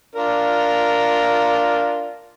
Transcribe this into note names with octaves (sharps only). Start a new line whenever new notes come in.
D4 F4 A#4